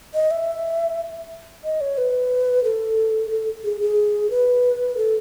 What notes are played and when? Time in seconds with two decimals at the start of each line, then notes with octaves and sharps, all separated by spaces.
0.14 D#5
0.31 E5
1.64 D#5
1.81 C#5
1.98 B4
2.64 A4
3.31 A4
3.64 G#4
3.81 G#4
4.30 B4
4.97 A4